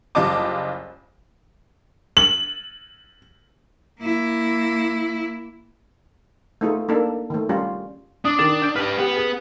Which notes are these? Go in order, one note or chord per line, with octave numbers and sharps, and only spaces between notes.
F#1 G3 F4 D#5 A5 D6
F#7
A#3 E4
A3 B3 D#4 F4 G#4
A#3 D4 D#4 A4 A#4
D#3 A3
G3 C#4 F4 G4
D4 D#6
D#3 A6 E7
G6 D7
G4 B4 F6
B3 G4 B4
G#4